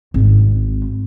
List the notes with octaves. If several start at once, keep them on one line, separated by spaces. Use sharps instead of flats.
G#1